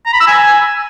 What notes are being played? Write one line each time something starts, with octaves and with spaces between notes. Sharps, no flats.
A#5
B5
E6
G#5